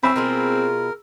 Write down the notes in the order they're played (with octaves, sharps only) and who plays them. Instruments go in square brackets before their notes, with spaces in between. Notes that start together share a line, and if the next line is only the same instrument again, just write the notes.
[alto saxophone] C4 [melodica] C#4 E5 [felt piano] B5 E6
[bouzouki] B2 F4 G#4 [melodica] A#4